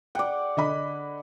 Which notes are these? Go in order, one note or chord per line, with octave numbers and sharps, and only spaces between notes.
D5 F#5 G5
D3 D#5 B5